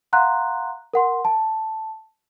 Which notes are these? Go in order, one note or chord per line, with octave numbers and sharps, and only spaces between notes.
F5 F#5 A#5 C6 F#6
A#4 F#5 C6
A5